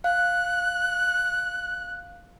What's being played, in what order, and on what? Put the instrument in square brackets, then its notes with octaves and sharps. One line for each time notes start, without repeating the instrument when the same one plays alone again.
[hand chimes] F5 [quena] F#6